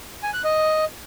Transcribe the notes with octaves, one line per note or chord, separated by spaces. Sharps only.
G#5
F#6
D#5